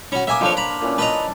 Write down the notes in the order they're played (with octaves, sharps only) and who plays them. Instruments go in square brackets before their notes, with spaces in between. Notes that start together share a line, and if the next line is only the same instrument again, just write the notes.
[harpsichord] C#4 F#4 [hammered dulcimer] B5
[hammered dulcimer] A#3 D6 [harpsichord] E5 G#5 D#6
[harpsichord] F2 F3 C#5 [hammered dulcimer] D4 C5
[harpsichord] A#5 B5
[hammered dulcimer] A#2 E3 C#4
[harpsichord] B4 D#5 A#5 [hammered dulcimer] A5